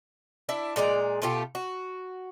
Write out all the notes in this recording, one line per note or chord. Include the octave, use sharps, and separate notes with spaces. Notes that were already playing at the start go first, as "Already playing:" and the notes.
D4 E4 E5
A#2 G#3 D5 A#5
B2 A3 F4 G4
F#4